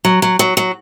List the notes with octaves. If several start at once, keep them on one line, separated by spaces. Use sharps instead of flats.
F#3
F#3
F#3
F#3